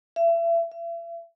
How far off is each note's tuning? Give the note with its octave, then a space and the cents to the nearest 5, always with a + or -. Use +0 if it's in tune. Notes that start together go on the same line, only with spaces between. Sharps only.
E5 +35
E5 +40